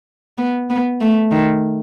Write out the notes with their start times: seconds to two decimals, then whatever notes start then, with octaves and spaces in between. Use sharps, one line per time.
0.38 B3
0.70 B3
1.01 A3
1.32 D#3